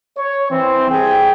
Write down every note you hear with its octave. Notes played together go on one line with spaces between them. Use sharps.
C#5
E3 C4
C2 G#4 G5